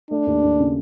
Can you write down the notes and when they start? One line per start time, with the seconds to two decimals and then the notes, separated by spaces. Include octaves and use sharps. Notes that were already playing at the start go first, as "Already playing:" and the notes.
0.10 A3 D4
0.27 D#2
0.44 D#2
0.59 C#3